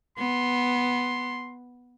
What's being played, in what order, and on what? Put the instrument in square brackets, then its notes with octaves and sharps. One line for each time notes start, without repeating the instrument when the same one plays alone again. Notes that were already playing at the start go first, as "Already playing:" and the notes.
[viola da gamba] B3 [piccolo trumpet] C6